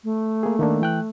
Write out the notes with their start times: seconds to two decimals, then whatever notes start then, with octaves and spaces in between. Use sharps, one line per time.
0.04 A3
0.43 A#3 G#4
0.59 D#3 A#3 D4
0.81 E3 G5 F#6